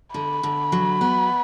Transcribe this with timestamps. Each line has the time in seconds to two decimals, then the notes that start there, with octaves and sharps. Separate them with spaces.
0.14 D3 B5
0.43 D3
0.72 F#3
1.01 B3